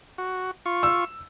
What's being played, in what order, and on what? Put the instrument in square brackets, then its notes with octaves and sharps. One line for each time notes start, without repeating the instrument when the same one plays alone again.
[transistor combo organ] F#4
F4 C#6
[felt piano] E6